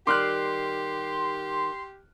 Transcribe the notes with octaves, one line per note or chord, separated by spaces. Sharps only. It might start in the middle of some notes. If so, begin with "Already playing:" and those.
D#3 G3 G4 C6 D6 F6 F#6